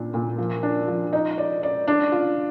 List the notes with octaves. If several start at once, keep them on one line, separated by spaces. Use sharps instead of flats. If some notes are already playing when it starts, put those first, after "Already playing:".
Already playing: A#2 D4
A#2
F3
D4
F3
D#4
D5
D5
D4
F4